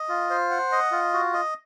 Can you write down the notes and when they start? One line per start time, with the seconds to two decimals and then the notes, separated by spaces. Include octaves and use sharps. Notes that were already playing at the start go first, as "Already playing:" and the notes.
Already playing: D#5
0.09 F4
0.30 C5
0.51 F#5
0.72 D#5
0.92 F4
1.14 F#4
1.33 D#5